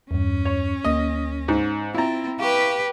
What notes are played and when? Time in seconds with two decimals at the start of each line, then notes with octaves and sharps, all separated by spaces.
0.11 E2 G2 C#4
0.45 C#5
0.84 D2 A#3 D#5 A#6
1.48 G#2
1.95 C4 E4 F4 A#5 A6
2.39 G4 B4 F5 C#6